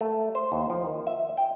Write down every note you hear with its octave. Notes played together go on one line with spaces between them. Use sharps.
A3
C5
D#2
F3
D#3
E5
G5